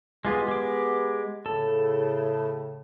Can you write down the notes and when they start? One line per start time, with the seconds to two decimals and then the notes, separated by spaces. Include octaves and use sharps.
0.25 G#3 B3 F4 G4 G#4
0.48 G#3 D6
1.46 A2 C#3 A4